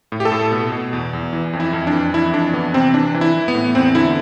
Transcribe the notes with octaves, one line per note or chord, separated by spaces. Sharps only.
A2
G4
A4
A2
B2
B2
E2
E2
E3
F2
E4
F2
D4
E3
F2 E4
F2 D4
E3 B3
C3 C4
E3 D4
E3
E4
E3
B3
A2
E2 C4
D3 E4